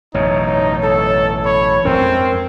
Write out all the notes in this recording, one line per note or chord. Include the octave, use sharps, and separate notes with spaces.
A1 F#2 B2 D#4 C#5
A4
C#5 B5
F2 G#2 C4 C#4 A#4